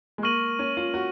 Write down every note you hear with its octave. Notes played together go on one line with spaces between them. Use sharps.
G#3
A#3 C#6 F6 A#6 D#7 F#7
C#4
F4
F#4